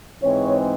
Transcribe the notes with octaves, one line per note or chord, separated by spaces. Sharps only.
G#2 E3 G#3 C4 C#5